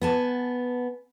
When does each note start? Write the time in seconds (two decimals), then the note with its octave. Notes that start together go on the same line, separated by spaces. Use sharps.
0.01 B3 G#5 A5